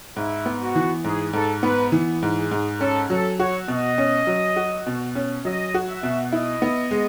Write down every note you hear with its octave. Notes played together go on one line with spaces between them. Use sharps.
G#2 E4
B3
F#4
E3
G#2 G#4
G#2 A4
B3 B4
E3
G#2
G#4
G#2
C#4 A4
F#3 A4
F#4 C#5
B2 D#5
C#4
F#3
F#4
B2
C#4
F#3 D#5
F#4
E5
B2
E4 D#5
B3
G#3